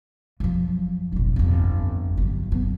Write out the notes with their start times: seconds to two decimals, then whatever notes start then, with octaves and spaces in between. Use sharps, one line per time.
0.40 F#2 F3
1.12 F1 A#1
1.36 G1 F2
2.17 G1 F#3
2.52 F3 B3